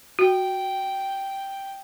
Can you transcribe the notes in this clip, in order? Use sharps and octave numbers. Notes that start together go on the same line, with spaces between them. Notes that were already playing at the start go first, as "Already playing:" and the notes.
F#4 G5